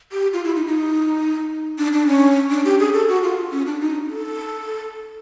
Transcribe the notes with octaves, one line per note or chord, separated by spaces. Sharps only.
G4
F4
E4
D#4
D#4
D4
D4
C#4
D4
G4
G#4
A4
F#4
F4
C#4
D4
D#4
A4